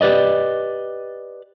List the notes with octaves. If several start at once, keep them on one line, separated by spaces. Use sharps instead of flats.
G4 B4 D5 D#5